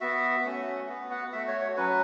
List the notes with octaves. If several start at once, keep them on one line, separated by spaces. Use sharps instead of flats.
B3 F#4 E5
A3 C#4 F#4
B3 F#4
F#5
A3 F#4 E5
C#5
C#5
F#3 C#4 F#4 B4